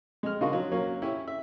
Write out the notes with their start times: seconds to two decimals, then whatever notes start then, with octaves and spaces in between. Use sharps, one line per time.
0.23 G#3 F6
0.41 C#3 D4 D#4 F4 F#4 A#4
0.53 F#3
0.72 F#3 A#3 C#4
1.02 C#4 E4 G4
1.28 E5